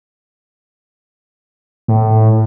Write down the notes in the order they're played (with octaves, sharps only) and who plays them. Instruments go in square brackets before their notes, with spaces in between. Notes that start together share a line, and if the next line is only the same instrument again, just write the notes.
[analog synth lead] A2